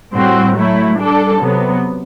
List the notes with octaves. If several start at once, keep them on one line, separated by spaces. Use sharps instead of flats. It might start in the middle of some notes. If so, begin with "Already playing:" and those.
A2 G3 C4 F#4
F#3 A3 E4
G3 D4 A4
C3 F#3 B3